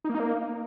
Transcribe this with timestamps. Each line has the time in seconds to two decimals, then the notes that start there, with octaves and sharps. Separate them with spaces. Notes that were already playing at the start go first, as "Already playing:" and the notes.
0.04 D#4
0.10 A#3
0.15 D#4
0.20 A#3